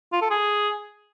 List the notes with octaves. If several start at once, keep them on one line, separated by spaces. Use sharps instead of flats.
F4
A4
G#4